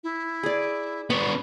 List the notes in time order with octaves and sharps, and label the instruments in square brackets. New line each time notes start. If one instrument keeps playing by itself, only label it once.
[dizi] E4
[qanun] G#4 D5
[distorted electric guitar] B3 D4 [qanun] B5 [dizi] C#6